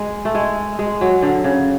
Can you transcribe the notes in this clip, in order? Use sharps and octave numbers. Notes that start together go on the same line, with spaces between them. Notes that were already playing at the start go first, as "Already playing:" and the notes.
Already playing: G#3
A3
G#3
G#3
F#3
D3
C#3